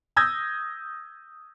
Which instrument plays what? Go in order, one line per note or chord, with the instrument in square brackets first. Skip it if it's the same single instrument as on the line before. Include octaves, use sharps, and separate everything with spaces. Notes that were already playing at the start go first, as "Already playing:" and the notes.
[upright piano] D#6 E6 G6 G#6 A#6